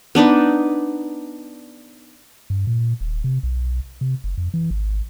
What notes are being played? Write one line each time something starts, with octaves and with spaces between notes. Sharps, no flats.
B3 D4 D#4 B4
G2
A#2
D#1
C3
B1
C3
F#1
F2
E3
G#1